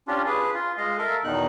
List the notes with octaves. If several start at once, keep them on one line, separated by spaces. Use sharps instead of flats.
C#4 D4 F4 G4
G#4 B4
F4
G#3 D#5 F5
A4 A#4 E5
E2 B2 D#3 D#4 F#6